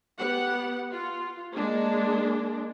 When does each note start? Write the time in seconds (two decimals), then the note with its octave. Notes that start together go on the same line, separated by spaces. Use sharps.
0.18 B3 G4 F#5
0.92 F4
1.54 G#3 A#3 D4